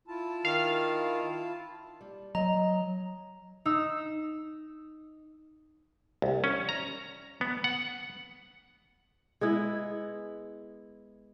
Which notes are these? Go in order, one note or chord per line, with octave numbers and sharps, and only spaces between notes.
E4 F4 A5
D#3 F5
G3
F#3 D#5 A#5
D#4 E6
C2
C#4
A#5
B3
F#5
G#3 B3 E4